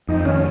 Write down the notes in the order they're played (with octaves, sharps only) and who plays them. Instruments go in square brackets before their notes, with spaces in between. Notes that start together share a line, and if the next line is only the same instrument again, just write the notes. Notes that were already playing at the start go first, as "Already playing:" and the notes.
[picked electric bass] F2 [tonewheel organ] D#4
[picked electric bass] D#3 [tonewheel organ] C#4